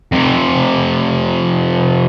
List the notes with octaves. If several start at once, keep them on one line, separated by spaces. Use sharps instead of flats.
F2 C3